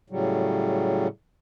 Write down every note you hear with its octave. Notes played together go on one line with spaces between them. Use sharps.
A2 C#3 F#3 G3